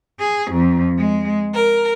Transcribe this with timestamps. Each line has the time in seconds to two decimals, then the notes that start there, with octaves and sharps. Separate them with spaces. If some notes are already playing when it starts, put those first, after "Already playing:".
0.20 G#4
0.51 F2
0.97 G#3
1.53 A#4